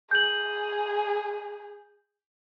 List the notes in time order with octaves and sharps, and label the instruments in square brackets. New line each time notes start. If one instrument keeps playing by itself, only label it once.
[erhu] G#4 [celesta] G6 F#7